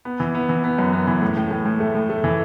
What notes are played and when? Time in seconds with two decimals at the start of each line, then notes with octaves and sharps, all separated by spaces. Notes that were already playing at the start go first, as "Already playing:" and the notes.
0.05 B3
0.20 E3
0.35 B3
0.49 E3
0.64 B3
0.78 F#2
0.93 B3
1.07 E3
1.22 A2
1.37 A2
1.51 A2
1.66 A2
1.80 A3
1.95 A2
2.10 A3
2.24 E3